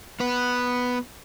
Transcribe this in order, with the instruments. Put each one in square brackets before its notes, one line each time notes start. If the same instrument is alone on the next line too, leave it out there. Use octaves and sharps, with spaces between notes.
[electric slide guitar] B3 B4